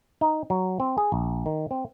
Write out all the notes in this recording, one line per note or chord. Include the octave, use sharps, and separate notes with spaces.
D#4
F#3
C4
G#4
A#1
D#3
C4